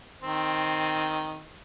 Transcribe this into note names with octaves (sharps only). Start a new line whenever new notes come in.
D#3 C4